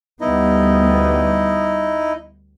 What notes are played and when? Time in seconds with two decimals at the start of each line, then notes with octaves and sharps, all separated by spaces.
0.21 D2 G3 B3 D#4 E4 D#5